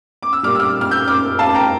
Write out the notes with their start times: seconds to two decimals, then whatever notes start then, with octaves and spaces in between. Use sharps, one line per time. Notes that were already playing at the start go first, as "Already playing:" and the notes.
0.23 D6
0.33 E6
0.43 A#2 G3 D6 F6
0.55 E6
0.59 D6 F6
0.81 F6
0.91 E6 G6
1.08 D6 F6
1.39 F5 A5
1.54 G5 A#5